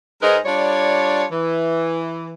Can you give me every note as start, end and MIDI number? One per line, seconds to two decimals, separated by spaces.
0.23 0.38 44
0.23 0.38 56
0.23 0.38 63
0.23 0.38 70
0.23 0.38 71
0.23 0.38 75
0.46 1.26 55
0.46 1.26 62
0.46 1.26 65
0.46 1.26 73
1.32 2.34 52